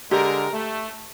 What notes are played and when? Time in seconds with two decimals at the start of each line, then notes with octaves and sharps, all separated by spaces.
0.11 D3 G#3 G4 A#4
0.53 A3